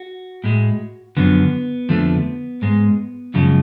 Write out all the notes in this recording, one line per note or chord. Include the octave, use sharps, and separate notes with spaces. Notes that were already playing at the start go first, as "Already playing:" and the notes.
Already playing: F#4
A2 G#3
F#2 D3 F3 B3
F2 D3 F3 A3
G#2 G#3
F#2 C#3 F3 G#3